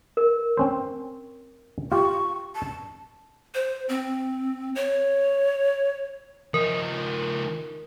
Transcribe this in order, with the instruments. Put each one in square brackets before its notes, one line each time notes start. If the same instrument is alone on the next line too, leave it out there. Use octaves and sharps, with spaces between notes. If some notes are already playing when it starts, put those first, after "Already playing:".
[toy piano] A#4
[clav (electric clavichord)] C4 C#4 C5
[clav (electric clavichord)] F4 G4 [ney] C#6
[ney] A5
[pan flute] C5
C4
C#5
[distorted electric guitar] F3 D#4 [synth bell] A#4